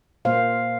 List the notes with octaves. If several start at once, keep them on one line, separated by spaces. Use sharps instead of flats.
A#2 A#3 C5 F5